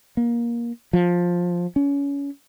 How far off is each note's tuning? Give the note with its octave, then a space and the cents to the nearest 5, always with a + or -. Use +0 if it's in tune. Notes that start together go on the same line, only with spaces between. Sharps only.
A#3 +20
F3 +10
C#4 +25